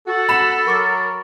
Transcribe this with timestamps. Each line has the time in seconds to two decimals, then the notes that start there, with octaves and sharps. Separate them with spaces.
0.08 F#4 A4
0.29 B5 E7
0.67 F#3 A#4 C#6 D6 A6